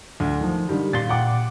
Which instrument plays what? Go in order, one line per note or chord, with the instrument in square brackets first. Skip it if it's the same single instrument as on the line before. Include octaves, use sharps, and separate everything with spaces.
[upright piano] D2
D#3 F3
D3 D#3 G3
[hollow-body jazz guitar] A#2 C6 [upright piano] A6
[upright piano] F#5 G5 D6